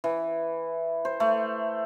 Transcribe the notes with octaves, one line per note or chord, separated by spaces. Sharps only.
E3
C5
A3